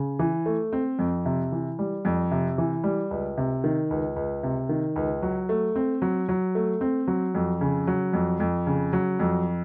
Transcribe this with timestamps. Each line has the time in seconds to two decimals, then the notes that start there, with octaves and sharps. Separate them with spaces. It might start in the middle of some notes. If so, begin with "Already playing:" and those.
Already playing: C#3
0.19 E3
0.46 A3
0.73 C4
0.99 F2
1.25 C3
1.52 E3
1.79 G3
2.05 F2
2.31 C3
2.58 E3
2.84 G3
3.11 C#2
3.37 C3
3.64 D#3
3.91 C#2
4.16 C#2
4.43 C3
4.69 D#3
4.96 C#2
5.23 F#3
5.49 A3
5.75 C4
6.02 F#3
6.29 F#3
6.55 A3
6.81 C4
7.08 F#3
7.35 F2
7.61 C#3
7.87 F#3
8.13 F2
8.40 F2
8.67 C#3
8.93 F#3
9.20 F2